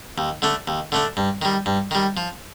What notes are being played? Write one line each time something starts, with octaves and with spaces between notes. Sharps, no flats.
D#2
D3 A3 D4
D#2
D3 A3 D4
G2
D#3 G3
G2
D#3 G3
F3